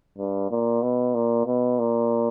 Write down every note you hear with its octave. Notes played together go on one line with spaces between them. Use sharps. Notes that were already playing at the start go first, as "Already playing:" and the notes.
G2
A#2
B2
A#2
B2
A#2